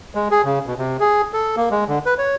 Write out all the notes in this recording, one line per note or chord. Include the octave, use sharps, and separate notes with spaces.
G#3
G#4
C#3
B2
C3
G#4
A4
A#3
G#3
D3
B4
C#5